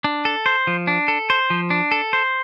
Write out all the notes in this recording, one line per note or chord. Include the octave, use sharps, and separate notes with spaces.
D4
A4
C5
F3
D4
A4
C5
F3
D4
A4
C5